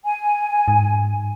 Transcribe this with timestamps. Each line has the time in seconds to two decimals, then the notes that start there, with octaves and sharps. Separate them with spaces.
0.04 G#5
0.68 G#2